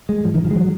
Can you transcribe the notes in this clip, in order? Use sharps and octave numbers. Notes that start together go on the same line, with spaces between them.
G#3
G#2 F3
D#3
F3
G#3
F#3